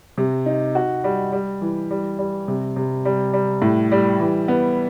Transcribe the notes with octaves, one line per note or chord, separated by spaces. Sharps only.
C3
D#4
F#4
G3
G3
E3
G3
G3
C3
C3
G3
G3
A2
G3
E3
B3